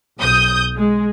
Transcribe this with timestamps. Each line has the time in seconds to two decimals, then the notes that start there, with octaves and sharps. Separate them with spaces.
0.19 B1 D#6 G6
0.76 G#3